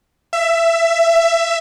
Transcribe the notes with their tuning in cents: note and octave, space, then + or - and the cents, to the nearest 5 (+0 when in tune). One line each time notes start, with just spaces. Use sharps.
E5 +20